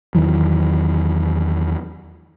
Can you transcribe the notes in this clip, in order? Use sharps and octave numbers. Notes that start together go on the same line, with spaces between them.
E2 D#3 E3 F#3